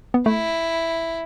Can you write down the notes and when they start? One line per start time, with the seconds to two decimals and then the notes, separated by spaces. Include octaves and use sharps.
0.14 B3
0.26 A3 E4